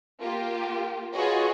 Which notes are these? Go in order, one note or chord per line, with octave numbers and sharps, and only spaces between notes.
A#3 F4 G4
F4 F#4 G#4 B4 C#5 D#5